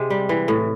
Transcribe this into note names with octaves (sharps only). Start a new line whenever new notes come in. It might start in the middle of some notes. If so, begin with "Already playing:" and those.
Already playing: C3 G#3
G3
E3
A2